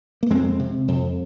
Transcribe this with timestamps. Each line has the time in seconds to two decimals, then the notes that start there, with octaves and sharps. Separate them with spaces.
0.23 A#3
0.30 F2 G#3 C4
0.59 C3
0.88 F2